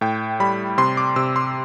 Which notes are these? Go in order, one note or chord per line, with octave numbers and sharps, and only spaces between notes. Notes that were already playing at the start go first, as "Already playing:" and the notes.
A2 G5
G3 B5
C3 C6
D6
C3 E6
C6